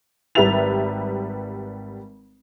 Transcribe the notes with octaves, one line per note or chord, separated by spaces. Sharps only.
G#1 G3 B4 E5 A6 F7